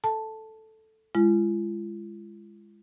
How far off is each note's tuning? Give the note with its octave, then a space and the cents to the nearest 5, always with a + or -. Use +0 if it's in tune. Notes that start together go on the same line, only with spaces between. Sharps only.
A4 +0 A5 +0
G#3 -10 F4 -45